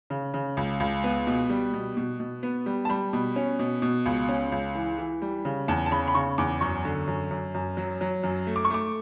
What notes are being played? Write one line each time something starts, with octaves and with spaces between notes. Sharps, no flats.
C#3
C#3
C#2
C#2
B3
B2
G3
B2
B2
B2
B3
G3
A5
G3 B5
B2
C#4
B2
B2
C#2
C#4
C#2
E3
E3
G3
C#3
E2 A5
A5
C#3 B5
B5
C#3 C#6
E2 D6
F#2 C#6
D3
F#2
F#2
F#2
F#3
F#3
F#2
A3
D6
C#6
A3 D6